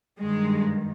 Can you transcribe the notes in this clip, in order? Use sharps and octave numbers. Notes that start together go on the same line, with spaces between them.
G2 D#3 G#3